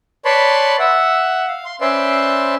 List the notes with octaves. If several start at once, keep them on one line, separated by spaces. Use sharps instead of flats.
B4 C#5 D5 A5 B5 C6
E5 F#5
F5
C6
C#4 B4 C5 D5 E5 C6